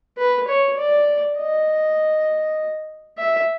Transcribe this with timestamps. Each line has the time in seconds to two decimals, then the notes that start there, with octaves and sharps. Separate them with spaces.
0.17 B4
0.47 C#5
0.77 D5
1.37 D#5
3.18 E5